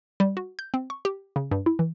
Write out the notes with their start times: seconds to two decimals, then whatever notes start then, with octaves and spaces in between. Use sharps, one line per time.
0.20 G3
0.37 F#4
0.59 G6
0.74 C4
0.90 C#6
1.05 G4
1.36 C#3
1.51 G2
1.66 E4
1.79 E3